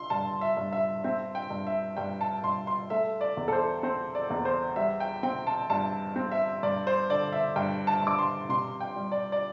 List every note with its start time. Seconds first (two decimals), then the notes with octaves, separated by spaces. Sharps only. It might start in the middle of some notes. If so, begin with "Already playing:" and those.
Already playing: C6
0.10 G2 A5
0.41 E5
0.57 G2
0.72 E5
1.04 C4 E5
1.35 G5
1.50 G2
1.67 E5
1.97 G2 G5
2.21 A5
2.43 G2 C6
2.67 C6
2.90 A3 E5
3.21 D5
3.37 E2
3.48 A4
3.52 C5
3.83 C4 C5
4.15 D5
4.30 E2
4.45 C5
4.76 G3 E5
5.00 G5
5.23 C4 G5
5.47 A5
5.70 G2 A5
6.16 C4
6.31 E5
6.63 G2 D5
6.87 C5
7.10 D3 D5
7.33 E5
7.56 G2 G5
7.87 A5
8.03 G2 D6
8.18 C6
8.49 C3 C6
8.81 G5
8.96 G3
9.12 D5
9.32 D5